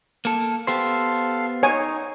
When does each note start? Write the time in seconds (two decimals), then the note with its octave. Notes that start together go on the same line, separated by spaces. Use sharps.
0.25 A#3 A4
0.67 B3 G4 A4 C5 F5
1.63 D#4 C#5 G#5